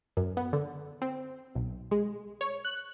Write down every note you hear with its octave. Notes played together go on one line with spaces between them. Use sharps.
F#2
B3
D3
C4
B1
G#3
C#5
F#6